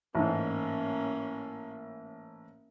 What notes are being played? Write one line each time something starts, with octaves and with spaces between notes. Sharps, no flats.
A1 G#2 A#3 C#4